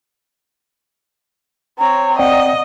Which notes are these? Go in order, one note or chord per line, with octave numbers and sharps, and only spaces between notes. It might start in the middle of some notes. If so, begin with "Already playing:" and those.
C4 C#5 A#5
C4 D5 D#5 F#5 G5